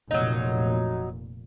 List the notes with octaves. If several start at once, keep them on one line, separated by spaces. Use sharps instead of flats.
F1 A#2 F#3 D#4